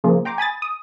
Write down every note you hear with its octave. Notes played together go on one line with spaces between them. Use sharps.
C#3 F3 A#3 F4 G#4 A#4
G5 A#5 C6 D6
G#5 B5 D#6 A6
D#6